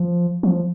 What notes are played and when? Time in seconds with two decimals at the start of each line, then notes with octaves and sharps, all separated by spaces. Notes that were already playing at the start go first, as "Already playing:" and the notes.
Already playing: F3
0.43 F3